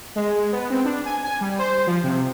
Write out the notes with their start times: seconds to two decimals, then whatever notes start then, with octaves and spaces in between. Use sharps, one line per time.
0.16 G#3
0.52 B3
0.70 C4
0.85 D4
1.05 G#5
1.24 G#5
1.41 G3
1.59 C5
1.87 F3
2.04 C3